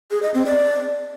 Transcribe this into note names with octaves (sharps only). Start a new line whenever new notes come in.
G#4
D#5
C4
D5